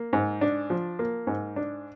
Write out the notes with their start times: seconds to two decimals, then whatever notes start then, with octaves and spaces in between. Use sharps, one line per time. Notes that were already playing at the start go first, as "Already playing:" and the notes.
Already playing: A#3
0.13 G#2
0.41 D4
0.70 F3
0.99 A#3
1.27 G#2
1.56 D4